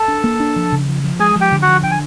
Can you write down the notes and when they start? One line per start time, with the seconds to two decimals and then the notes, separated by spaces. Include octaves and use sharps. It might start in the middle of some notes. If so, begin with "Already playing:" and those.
Already playing: A4 A5
0.08 D4
0.24 A#3
0.40 D4
0.56 F3
0.72 C#3
0.88 F3
1.04 F3
1.19 G#3 G#4 G#5
1.36 F3
1.41 G4 G5
1.52 D3
1.62 F#4 F#5
1.68 F3
1.83 D3 G5
1.91 G#5